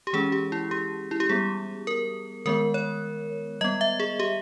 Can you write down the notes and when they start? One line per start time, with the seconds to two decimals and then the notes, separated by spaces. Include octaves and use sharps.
0.07 G4
0.13 E3 G#3 C#4 G#4
0.32 G4
0.52 E4
0.71 G4
1.11 E4
1.20 G4
1.29 G3 B3 G#4
1.87 A#4
2.46 D#3 G#3 B3 A#4
2.74 C#5
3.61 G3 B3 D#5
3.81 E5
4.00 G#4
4.20 G4